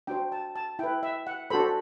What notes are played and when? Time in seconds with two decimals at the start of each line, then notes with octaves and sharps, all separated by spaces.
0.07 D4 F#4 C5 G5
0.32 A5
0.56 A5
0.79 E4 B4 G5
1.03 E5
1.27 F#5
1.50 D4 F#4 A4 C5 B5